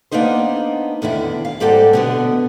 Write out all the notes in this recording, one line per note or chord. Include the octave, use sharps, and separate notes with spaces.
A#3 B3 D4 D#4 C5
E2 D3 D#3 E4
F5
G#2 G3 C4 G4 A4 F#5
B2 D3 B3